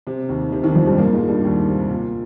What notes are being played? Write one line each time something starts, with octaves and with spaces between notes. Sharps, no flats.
C3
D#2 D#3
C3 C4
D#2 D#3
F2 F3
G2 G3
A#2 A#3
G#2 G#3
G2 G3
D#2 D#3
C3
A#2